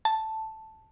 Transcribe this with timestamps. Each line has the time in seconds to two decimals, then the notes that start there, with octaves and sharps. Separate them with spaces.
0.05 A5